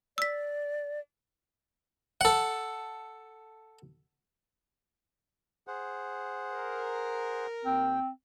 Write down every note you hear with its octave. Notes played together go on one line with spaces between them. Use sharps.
D5 E6 B6
A4 F#5
G#4 C5 F#5
A#4
D#2 C4 G5